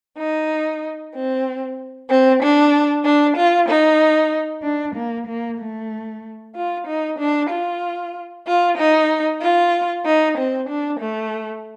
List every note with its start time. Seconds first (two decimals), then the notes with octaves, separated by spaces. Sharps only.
0.18 D#4
1.14 C4
2.09 C4
2.41 D4
3.05 D4
3.37 F4
3.68 D#4
4.64 D4
4.96 A#3
5.28 A#3
5.59 A3
6.55 F4
6.87 D#4
7.19 D4
7.50 F4
8.47 F4
8.78 D#4
9.42 F4
10.06 D#4
10.37 C4
10.69 D4
11.01 A3